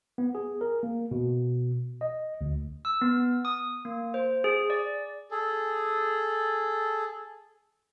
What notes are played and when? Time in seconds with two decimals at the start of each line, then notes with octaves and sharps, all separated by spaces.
0.18 B3
0.35 G#4
0.61 A#4
0.83 A#3
1.11 B2
2.01 D#5
2.41 D2
2.85 E6
3.02 B3
3.45 D#6
3.85 A#3
4.14 C5
4.44 G#4
4.70 D5
5.31 G#4 A4